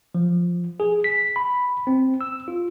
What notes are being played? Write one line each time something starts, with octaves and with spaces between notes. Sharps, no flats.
F3
G#4
B6
B5
C4
E6
F4